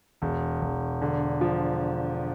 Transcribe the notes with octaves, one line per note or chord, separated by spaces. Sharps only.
E1
E1
D3
F3